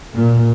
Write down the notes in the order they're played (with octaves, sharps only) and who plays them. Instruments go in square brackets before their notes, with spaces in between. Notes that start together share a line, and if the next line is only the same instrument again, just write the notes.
[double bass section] A#2